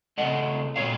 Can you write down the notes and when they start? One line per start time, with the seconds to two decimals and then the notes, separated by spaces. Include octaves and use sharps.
0.18 C#3 F3 A3 D#5 F#5
0.76 A#2 F#3 A#3 C#5 F5